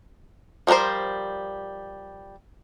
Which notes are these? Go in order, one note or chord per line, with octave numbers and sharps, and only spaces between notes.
F3 G3 F#4 A#4 C5